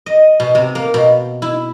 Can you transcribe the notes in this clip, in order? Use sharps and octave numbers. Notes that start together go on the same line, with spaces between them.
D#5
B2
C3
A#3
B2
E4